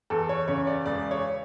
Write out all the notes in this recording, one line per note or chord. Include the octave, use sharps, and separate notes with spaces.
E2 A4
C#5
C#3 C#5
D5
E1 D5
C#5